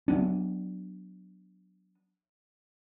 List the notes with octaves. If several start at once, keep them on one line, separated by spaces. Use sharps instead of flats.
F#3 B3 D4